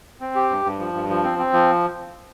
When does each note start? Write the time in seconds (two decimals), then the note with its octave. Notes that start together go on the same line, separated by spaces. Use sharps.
0.20 C4
0.35 G4
0.50 G2
0.65 G2
0.79 F3
0.93 G2
1.09 F3
1.24 C4
1.38 C4
1.53 F3